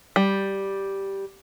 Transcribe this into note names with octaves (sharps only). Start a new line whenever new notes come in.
G3